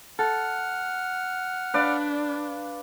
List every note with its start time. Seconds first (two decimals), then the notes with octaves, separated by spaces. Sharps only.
0.19 A4 F#5 F6
1.74 D4 B4 D5 F5